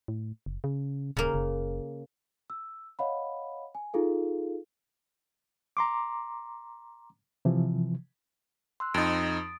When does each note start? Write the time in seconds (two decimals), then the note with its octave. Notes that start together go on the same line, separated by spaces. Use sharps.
0.08 A2
0.46 F#1
0.64 C#3
1.17 D#1 C#3 A#3
1.34 F#1
2.50 E6
2.99 C#5 D#5 F5 F#5 B5
3.75 G#5
3.93 D#4 F4 G#4 A4 F5
5.77 A#5 C6 D6
7.45 C3 E3 F3
8.80 C6 E6 F#6
8.94 F2 D#4 D#6 A6 D7